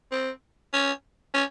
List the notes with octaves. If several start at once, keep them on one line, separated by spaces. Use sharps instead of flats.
C4
C#4
C#4